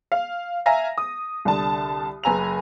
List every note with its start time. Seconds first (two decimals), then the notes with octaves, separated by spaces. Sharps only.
0.12 F5
0.66 E5 F5 G#5 A#5 A#6
0.98 D#6
1.45 C2 D3 A5
2.24 F#1 B4 G#5 A#5 E6 F7